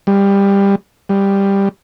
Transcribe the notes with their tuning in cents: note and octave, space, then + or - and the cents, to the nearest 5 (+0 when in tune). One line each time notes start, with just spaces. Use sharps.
G3 +20
G3 +10